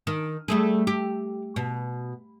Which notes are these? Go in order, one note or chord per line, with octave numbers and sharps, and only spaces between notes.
D#3
G3 A3 G#4
G4
B2